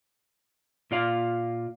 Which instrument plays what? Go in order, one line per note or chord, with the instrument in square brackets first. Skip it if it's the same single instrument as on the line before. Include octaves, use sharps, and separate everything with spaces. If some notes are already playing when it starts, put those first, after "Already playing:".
[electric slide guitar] A#2 F4 D5 F5